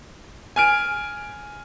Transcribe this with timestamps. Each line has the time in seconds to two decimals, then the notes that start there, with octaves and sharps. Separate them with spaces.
0.56 G#5 F6 D7